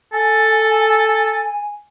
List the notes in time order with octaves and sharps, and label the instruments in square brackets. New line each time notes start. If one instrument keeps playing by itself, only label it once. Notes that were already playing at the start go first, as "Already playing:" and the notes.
[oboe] A4 [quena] G#5